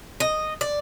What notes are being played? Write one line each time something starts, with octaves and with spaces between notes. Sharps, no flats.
D#5
D5